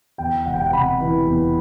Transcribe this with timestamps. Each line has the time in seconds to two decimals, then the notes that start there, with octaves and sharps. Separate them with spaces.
0.18 E2 G5
0.46 E1 F#5
0.54 G5
0.62 F#5
0.73 C3 B5
1.01 E3
1.26 E2